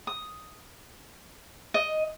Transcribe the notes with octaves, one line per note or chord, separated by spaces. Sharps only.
D#6
D#5